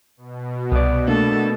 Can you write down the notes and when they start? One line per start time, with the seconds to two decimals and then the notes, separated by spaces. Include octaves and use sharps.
0.17 B2
0.72 C2 B3 D5
1.08 A3 A#3 D4 A4